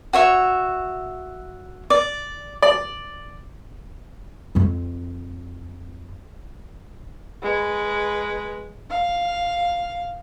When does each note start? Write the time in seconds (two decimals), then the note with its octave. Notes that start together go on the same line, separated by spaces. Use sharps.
0.13 F#4 C#5 E5
1.90 D5
2.62 D5
4.55 F2 C4
7.42 G#3 B4
8.90 F5